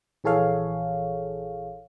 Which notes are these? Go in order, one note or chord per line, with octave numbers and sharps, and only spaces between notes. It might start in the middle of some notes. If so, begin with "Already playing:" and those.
A#1 E3 G#4 A4 C#5 F5